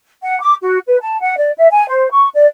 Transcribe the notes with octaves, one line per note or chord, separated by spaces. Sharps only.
F#5
D6
F#4
B4
A5
F#5
D5
E5
G#5
C5
C#6
D5